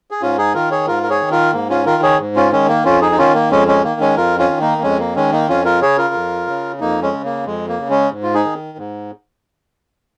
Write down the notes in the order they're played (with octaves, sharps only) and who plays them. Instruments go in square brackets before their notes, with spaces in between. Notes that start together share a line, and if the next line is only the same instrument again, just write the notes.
[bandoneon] G#4
G#2 C#4 F4
D#4 G#4
D#3 F4 A#4
G#4 C#5
G#2 F4 A#4
A#4
G#4 C#5
D#3
F4 A#4
G#2 A#3
C#4 F4
D#3 F4 A#4
G#4 C#5
G#2
C#4 F4
D#3 G#3 C#4
A#3
F2 C#4 F4
D#4 G#4
D#4
D#3 C#4 F4
A#3
F2 G#3 C#4
G#3 C#4
D#3 A#3
G#3 C#4
F2 F4 A#4
C#4 F4
D#3
A#3 D#4
A#3
F2 G#3 C#4
A#3
D#3 G#3 C#4
A#3 D#4
F2 C#4 F4
F4 A#4
C#3 G#4 C#5
F4 A#4
F2
C#3
F2 A#3 D#4
G#3 C#4
C#3
A#3
F2 G#3
A#3
C#3
G#3 C#4
G#2
F4
D#4 G#4
D#3
G#2